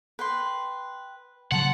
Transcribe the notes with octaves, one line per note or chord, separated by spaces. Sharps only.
B4 G5 C6
C#3 F3 F#3 F#5 A5 C6